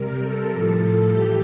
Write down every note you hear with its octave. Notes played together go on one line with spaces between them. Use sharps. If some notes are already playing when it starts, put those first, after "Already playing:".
Already playing: C3 G3 A#4
A4
A2 F3 A4
A4
E3 G3 G4